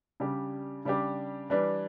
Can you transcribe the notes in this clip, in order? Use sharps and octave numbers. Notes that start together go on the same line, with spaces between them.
C#3 G3 D4 G4
C#3 G3 D4 G4
E3 G3 D4